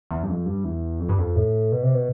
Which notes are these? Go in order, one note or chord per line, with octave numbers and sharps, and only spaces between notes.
E2
G2
F2
G2
E2
F2
G2
F2
A2
B2
C3
B2